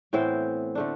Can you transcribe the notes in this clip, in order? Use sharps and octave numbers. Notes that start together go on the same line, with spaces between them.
A2 E3 B3 C4 E4 C5
D3 A3 D4